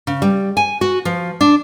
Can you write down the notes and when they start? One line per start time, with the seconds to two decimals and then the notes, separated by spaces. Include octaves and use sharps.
0.07 C#3
0.22 G3
0.57 G#5
0.81 F#4
1.05 F3
1.41 D4